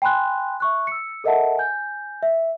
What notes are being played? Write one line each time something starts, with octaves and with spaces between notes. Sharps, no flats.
G5 G#5 B5 C6 F#6
E5 C#6 F#6
E6 C#7
A4 A#4 D#5 E5 F#5 A5
G#5 G6
E5